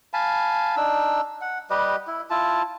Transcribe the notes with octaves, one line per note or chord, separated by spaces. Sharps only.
F5 G#5 A5 B5
D4 D#4 E6
F#5
G3 G4 B4 D#5
E4
E4 F4 A5